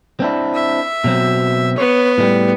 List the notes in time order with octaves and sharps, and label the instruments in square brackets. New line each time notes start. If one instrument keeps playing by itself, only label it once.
[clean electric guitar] C4 D4 E4
[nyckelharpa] E5
[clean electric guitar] B2 F#3 C4
[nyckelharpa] B3 [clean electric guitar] C#5
[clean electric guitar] A2 G3